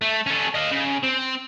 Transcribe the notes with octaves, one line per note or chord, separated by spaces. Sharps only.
A3
C#4 A4
D#5 F5
C#3
C4